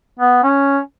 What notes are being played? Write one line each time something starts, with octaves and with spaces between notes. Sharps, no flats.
B3
C#4